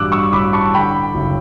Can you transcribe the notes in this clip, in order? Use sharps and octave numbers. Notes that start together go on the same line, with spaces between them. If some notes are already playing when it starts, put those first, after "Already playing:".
Already playing: A1 G2 E3 D6 E6 F#6
C#6 E6
A1 B5 D6
A5 C#6
D3 G5 B5
F#1